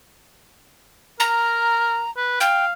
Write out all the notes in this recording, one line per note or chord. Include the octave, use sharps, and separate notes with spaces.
A#4 A#5
B4
F5 G5